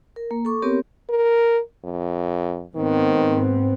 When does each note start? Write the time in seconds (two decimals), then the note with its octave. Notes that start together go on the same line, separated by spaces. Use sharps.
0.16 A#4
0.31 A#3
0.45 A4 C#6 D6
0.62 B3 C4 G4 A#4 C#5
1.10 A#4
1.84 F2
2.76 G#2 D#3 B3 C4